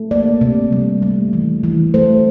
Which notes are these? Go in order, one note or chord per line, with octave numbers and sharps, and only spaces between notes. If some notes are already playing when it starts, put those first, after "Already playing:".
Already playing: A3
A#3 D5
C3
G3
A3
E3
E3
A3 C5